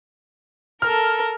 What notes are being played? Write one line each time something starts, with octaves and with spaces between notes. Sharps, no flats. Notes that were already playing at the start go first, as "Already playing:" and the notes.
A4 A#4 F6